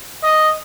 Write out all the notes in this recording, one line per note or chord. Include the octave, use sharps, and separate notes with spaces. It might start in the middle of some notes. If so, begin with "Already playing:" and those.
D#5